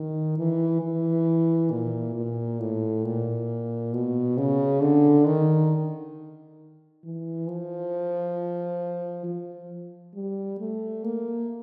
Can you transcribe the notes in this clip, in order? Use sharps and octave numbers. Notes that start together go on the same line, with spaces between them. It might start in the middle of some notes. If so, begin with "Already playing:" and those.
Already playing: D#3
E3
E3
A#2
A#2
A2
A#2
B2
C#3
D3
D#3
E3
F3
F3
G3
A3
A#3